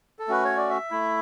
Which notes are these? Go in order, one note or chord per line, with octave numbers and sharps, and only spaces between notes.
A4
A3 C#4 F#4 B4
C#5
D5
E5
A3 E4